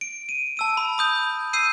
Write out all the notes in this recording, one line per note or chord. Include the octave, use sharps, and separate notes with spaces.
D7
D#7
A5 E6 D#7
B5
B5 D#6 G6
E6 G6 C7 D#7